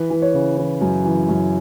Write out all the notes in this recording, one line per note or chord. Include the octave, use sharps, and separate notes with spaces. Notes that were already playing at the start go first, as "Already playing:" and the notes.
Already playing: E3 B4
E3
C#5
C#3
E3 B4
F#2
E3
F#2